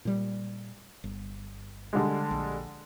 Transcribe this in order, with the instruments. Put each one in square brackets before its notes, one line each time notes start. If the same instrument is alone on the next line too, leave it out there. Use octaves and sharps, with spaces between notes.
[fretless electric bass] A#2 G3
G1
[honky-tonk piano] D3 G3 G#3
[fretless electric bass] A#1